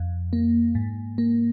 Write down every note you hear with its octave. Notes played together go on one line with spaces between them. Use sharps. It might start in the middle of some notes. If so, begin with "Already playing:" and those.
Already playing: F2
A#3
G#2
A#3